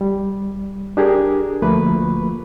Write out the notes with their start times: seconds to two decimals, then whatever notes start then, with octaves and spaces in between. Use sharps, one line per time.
0.01 G3
0.97 D4 G4 G#4 A#4
1.62 D2 F3 A3 A#3 B4 B5